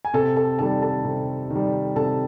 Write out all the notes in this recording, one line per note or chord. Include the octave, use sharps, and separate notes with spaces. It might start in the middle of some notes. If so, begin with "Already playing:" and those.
G#5
C3 A4 A5
A4 A5
D#3 G3 A4 A5
A4 A5
C3
D#3
G3
C3 A4 A5